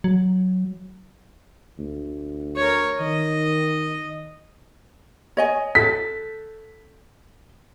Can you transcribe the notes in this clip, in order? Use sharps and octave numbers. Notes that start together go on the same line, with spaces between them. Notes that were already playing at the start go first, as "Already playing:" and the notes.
F#3
D2
A#4 C#5
D#3 D#5
C#5 D#5 G#5
A4 B6